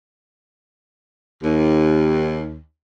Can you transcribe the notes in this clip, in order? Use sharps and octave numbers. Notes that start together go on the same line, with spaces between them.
D#2